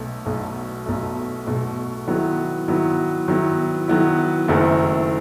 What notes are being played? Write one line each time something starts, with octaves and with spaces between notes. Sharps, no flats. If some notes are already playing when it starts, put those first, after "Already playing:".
Already playing: B1 B2 A3
B1 B2 A3
B1 B2 A3
B1 B2 A3
D#3 F#3 B3 E4
D#3 F#3 B3 E4
D#3 F#3 B3 E4
D#3 F#3 B3 E4
F#1 F#2 D#3 A3 E4